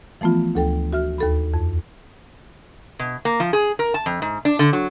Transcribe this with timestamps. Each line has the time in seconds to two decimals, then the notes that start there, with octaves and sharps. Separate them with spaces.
0.21 E3 F3 A3 B3 F4
0.55 D2 A4 G5
0.93 F#4 E5 F6
1.18 D#2 A4 B5
1.54 F2
2.99 B2
3.25 A#3
3.40 F3
3.53 G#4
3.79 A#4
3.94 A5
4.06 F2
4.22 G#2
4.45 D4
4.59 D3
4.73 F#3